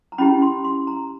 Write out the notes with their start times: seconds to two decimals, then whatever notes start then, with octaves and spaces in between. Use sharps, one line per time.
0.12 A#5
0.18 C#4 E4 G4 B5
0.42 C6
0.64 C6
0.87 A#5